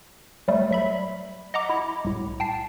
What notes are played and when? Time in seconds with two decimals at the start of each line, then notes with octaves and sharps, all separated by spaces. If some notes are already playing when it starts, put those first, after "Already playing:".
0.48 F#3 G3 A3
0.71 F#3 E5 B5
1.54 D#5 F#5 A#5 D6
1.69 E4
2.05 C2 A2
2.40 G5 A5 C7